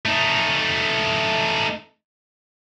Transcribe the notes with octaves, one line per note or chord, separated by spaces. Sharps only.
A3 D#4